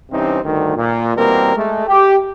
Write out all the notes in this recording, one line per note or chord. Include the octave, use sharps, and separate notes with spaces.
G2 C3 E3 C4 C#4 D#4
D2 G2 D#3
A#2
B2 E3 G3 A#3 C4 A#4
G#3 A3
G4